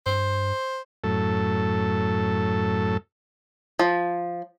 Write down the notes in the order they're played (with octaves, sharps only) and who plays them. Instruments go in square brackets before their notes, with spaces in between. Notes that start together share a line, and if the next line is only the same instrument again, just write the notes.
[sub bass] G2 [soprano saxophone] C5
[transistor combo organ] F#2 A2 A4
[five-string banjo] F3